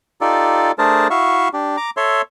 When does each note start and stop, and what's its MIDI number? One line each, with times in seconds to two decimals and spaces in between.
0.21 0.72 63
0.21 0.72 65
0.21 0.72 67
0.21 0.72 69
0.21 0.72 74
0.79 1.08 57
0.79 1.08 62
0.79 1.08 68
0.79 1.08 70
0.79 1.08 72
0.79 1.08 81
1.10 1.48 64
1.10 1.48 66
1.10 1.48 76
1.10 1.48 77
1.10 1.48 85
1.54 1.76 62
1.54 1.76 67
1.77 1.90 82
1.77 1.90 86
1.97 2.22 69
1.97 2.22 73
1.97 2.22 76
1.97 2.22 84